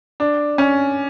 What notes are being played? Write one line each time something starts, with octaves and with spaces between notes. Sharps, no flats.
D4
C#4